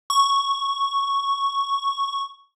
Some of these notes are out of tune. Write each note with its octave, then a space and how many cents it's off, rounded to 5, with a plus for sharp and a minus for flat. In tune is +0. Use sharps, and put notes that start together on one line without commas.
C#6 +0